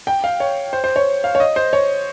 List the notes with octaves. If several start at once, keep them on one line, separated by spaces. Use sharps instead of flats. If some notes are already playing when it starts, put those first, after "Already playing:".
G5
F5
C#5
C5
C5
C#5
F5
C#5
D#5
C5
C#5